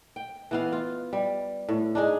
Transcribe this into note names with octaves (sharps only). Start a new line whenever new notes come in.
G5
E3 B3 F5
F4
G3
A2
D4 D#4 G#4